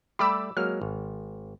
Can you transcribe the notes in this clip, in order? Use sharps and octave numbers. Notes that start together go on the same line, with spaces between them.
G3 A3 G4 B5 D6 E6
F#3 G#3 A#3 F6
G#1